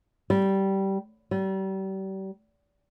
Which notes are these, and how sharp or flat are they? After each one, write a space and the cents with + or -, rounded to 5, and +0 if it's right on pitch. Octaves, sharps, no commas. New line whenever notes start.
G3 -15
G3 -35